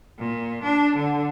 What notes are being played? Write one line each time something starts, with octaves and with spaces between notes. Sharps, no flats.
A#2
D4
D3